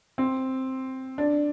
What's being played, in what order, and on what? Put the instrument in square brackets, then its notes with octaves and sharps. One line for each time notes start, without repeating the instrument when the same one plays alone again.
[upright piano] C4
D4